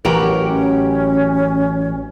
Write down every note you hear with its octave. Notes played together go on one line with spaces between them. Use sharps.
A1 E3 F#3 F#4 G4 A#4 B4
C#4